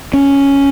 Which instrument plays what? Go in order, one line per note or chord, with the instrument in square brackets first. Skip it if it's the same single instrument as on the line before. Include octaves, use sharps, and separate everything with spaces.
[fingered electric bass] C#4